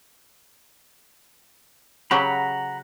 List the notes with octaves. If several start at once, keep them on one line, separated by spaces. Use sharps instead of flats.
C#3 F#3 G4 F#5 A#5 B5